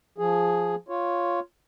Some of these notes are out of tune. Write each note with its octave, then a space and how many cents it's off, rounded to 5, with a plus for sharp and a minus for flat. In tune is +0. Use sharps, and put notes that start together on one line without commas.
F3 +0 G#4 +0
F4 +0 C#5 +0